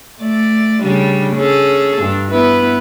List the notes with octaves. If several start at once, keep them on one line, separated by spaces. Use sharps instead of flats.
A3 D5
C#3 G3 D4
C#4 G#4 A4
G2 D4
B3 E4 B4